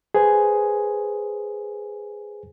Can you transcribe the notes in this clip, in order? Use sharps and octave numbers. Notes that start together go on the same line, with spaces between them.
G#4 B4 C5 G#5